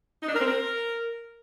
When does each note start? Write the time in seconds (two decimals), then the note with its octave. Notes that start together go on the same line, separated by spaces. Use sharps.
0.22 D#4
0.29 D4
0.35 A#4
0.41 C4
0.47 A#4